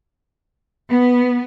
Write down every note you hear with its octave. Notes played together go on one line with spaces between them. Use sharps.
B3